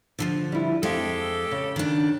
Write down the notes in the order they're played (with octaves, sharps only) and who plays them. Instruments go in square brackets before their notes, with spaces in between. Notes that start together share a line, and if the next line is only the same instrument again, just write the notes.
[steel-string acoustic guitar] D3 E3 F3
[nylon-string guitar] G3 E4
[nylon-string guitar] F2 F5 [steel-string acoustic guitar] G#3 [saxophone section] G4 A4
[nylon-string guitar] C#3
[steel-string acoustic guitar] D#3 D4